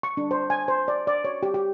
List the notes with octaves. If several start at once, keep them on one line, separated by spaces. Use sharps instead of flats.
C#6
D4
C5
G#5
C5
D5
D5
C#5
G4
G4